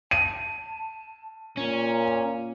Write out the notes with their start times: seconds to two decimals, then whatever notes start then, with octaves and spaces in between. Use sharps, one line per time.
0.11 A5 D#7
1.57 A#2 C#4 A#5